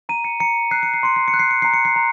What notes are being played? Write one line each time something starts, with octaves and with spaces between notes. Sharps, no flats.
A#5 D#7
C#7
A#5 C#7
F#6 C7
C#7
C7
C6 C#7
C7
C#7
F#6
C7
C#7
A#5 C7
C#7
C7
A#5